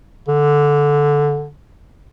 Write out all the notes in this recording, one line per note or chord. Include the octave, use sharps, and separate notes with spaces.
D3